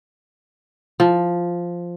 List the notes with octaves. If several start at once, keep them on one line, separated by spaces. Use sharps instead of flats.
F3